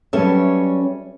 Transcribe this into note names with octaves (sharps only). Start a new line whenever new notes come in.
F#3 G3 C#4 A4 B4 E5